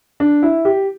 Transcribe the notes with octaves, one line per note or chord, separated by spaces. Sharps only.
D4
E4
G4